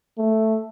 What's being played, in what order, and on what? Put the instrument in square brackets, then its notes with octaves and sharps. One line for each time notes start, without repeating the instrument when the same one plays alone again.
[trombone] A3